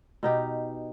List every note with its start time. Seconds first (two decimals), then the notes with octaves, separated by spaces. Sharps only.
0.23 B2 D#4 G4